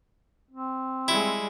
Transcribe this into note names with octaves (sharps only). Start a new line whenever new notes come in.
C4
G3 G#3 E4